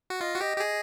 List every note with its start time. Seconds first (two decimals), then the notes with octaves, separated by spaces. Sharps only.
0.10 F#4
0.20 F4 D#5
0.35 F#4
0.41 G4 D#5
0.57 G4
0.60 G#4